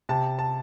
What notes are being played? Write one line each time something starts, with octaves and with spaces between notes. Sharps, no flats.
C3 A5
A5